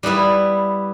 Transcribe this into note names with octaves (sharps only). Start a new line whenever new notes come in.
G3 B3 E4 B4